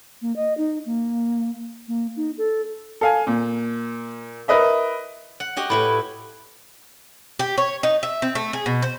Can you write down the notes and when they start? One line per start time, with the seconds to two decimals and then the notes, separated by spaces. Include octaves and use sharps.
0.22 A#3
0.36 D#5
0.58 D#4
0.86 A#3
1.88 A#3
2.16 D#4
2.38 A4
3.01 A4 F5 G#5
3.27 A#2
4.48 E4 A#4 B4 D#5 E5
5.40 F#5
5.56 F#4 G4 D#5
5.70 A2 E4 A4 B4 B5
7.39 G4
7.58 C#5
7.83 D#4
8.03 E5
8.22 C4
8.35 A3
8.53 G#4
8.66 B2
8.82 C5